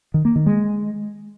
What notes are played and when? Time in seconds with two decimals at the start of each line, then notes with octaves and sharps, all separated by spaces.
0.14 D#3
0.25 A#3
0.36 D#3
0.46 G#3